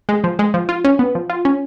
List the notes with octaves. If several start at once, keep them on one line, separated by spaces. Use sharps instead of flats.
G#3
F3
G#3
F3
F4
C#4
B3
F3
F4
C#4